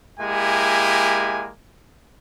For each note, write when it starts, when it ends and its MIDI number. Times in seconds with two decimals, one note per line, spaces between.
0.20 1.50 56
0.20 1.50 58
0.20 1.50 64
0.20 1.50 67
0.20 1.50 80